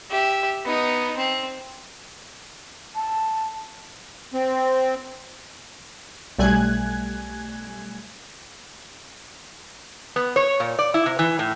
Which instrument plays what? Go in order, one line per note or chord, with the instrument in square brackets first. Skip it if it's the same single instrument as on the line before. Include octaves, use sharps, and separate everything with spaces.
[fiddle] G4 E5
B3 D#4
C4
[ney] A5
[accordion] C4
[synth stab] B1 G3 A3 G#5 F#6 G#6
[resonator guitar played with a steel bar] B3
C#5
A#2
D5
E4
C3
E3
A2